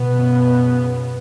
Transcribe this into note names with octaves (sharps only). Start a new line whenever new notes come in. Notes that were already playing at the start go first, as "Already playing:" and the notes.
Already playing: B2 B3
F#2 C#3